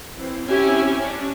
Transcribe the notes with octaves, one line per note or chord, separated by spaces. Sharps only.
E3 C4
C4 C#4 E4 G4 E5 G#5
C#4 D4